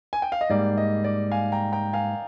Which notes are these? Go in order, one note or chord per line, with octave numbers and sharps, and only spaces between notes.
G#5
G5
F5
D#5
G#2 G3 A#3 D5
D#5
D5
F5 G#5
G5 A#5
G5 A#5
F5 G#5